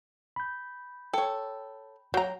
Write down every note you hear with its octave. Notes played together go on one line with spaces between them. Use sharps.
B5 G6
A4 C#5 G5
F#3 F#5 G5 A#5